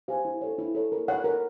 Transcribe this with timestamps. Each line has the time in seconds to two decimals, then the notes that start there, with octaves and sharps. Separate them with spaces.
0.08 G4 C5 F5 G#5
0.25 E4
0.41 A4 C#5
0.59 E4
0.75 A4 C#5
0.92 A#4
1.08 C#5 F#5
1.24 A#4